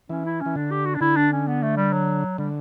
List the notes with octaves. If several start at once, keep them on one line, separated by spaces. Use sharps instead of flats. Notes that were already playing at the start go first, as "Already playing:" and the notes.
E3 C#4
E4
C#4
E3
D3 D4
G4
F#4
D4
D3 E4
D4
C#4
B3
A3
G3
F#3
D3 G3